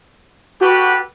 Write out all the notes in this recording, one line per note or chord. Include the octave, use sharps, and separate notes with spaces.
F#4 G4 A4 B4